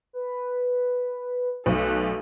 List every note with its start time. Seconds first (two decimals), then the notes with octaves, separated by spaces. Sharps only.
0.13 B4
1.66 B1 A3 F#6